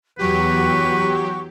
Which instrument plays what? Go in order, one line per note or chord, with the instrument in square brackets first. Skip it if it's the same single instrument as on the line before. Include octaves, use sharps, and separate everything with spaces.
[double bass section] E2 [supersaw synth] F#3 G4 [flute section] F#4 F#5 C#6 [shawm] B4